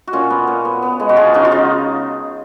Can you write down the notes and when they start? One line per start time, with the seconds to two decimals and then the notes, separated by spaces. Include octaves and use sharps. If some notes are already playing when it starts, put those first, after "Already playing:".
0.07 F#4
0.13 A#2 C#4 F4
0.30 B3
0.47 A#2
0.65 B3
0.82 B3
1.00 G#3
1.09 F#4
1.16 F3 F4 G#4
1.34 C#3 D#4 F#4
1.45 F4
1.51 C#3 D#4